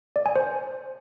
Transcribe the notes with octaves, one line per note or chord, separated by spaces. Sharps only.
D5
G#5
C5